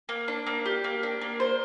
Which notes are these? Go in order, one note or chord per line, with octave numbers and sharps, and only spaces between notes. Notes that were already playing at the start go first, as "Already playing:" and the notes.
A#3
D4
A#3
G4
A#3
D4
A#3
C5